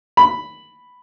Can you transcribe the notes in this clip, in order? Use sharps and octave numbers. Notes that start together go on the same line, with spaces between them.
B5